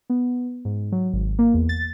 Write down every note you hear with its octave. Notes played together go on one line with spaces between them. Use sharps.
B3
G#2
F#3
G#1
A#3
E2
A6